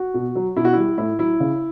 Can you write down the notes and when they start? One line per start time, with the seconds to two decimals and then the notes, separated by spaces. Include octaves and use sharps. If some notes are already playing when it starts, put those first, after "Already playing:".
Already playing: F#4
0.14 B2
0.35 F#3
0.56 B2 E4
0.65 F#4
0.73 G3 E4
0.98 A2 E4
1.19 F#3 E4
1.40 C#3